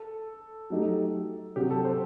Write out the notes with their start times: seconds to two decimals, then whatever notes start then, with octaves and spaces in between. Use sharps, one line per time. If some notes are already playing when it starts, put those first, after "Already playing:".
Already playing: A4
0.70 F#3 A3 D#4 G4
1.56 C3 F#3 C4 F#4 G4
1.71 A4
1.85 C5